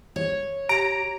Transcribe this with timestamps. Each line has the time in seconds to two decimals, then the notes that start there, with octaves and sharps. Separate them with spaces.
0.16 C#5
0.69 G4 A#5 D7